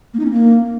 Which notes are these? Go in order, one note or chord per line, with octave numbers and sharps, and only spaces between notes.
A#3
D#4
C#4
A#3